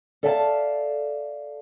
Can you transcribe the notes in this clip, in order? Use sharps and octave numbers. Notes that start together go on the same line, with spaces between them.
A4 D5 E5 F5 G5 A5